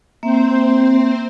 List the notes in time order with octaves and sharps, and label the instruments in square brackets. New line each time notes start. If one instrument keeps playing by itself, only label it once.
[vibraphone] A#3 E5 [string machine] C4 C5